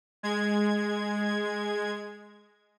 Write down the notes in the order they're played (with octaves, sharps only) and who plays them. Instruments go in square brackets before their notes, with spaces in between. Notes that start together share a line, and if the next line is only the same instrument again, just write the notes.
[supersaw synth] G#3 G#6